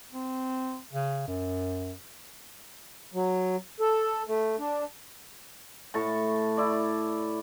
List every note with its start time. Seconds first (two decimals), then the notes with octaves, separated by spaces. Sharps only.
0.13 C4
0.93 C#3
1.27 F#2
3.14 F#3
3.80 A4
4.28 A3
4.59 D4
5.94 A2 A5 C#6
6.57 E4 D5